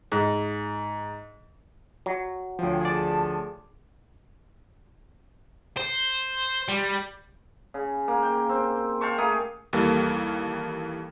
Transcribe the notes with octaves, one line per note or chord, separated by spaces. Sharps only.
G#2
F#3
D2 F3 C#5 F5 G5
G#4 D5 A5
C5
G3
C#3
A#3
G5
C4
F5 G5 A5 C#6
A3 A#3 G#4
D#2 E3 G3 A#3 A4